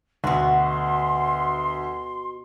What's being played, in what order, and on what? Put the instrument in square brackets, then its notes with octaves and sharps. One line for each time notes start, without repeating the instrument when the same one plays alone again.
[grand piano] D2 [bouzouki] B2 F#4 [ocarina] C6